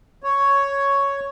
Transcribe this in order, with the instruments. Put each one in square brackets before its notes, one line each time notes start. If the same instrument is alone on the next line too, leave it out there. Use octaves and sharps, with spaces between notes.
[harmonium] C#5